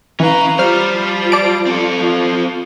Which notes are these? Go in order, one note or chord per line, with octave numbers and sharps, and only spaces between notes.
E3 C#4 B4 F5 A#5
G3 F4 C5 F6
F3 F4
D5 A5 D7
C4 A4
F3